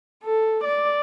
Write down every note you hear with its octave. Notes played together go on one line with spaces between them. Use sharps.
A4
D5